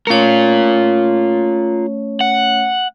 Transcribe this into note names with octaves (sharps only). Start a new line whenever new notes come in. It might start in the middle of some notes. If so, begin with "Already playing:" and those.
A3 C#4 F4 A#4 C#5
F#5